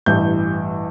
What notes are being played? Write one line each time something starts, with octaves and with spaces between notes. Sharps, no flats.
A1 G2 E3 G6